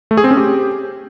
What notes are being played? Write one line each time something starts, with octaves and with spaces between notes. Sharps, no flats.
A3
G#4
C4
C#4
G4